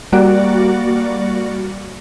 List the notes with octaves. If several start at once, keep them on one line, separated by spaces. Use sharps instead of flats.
G3 A#3 F#4 D5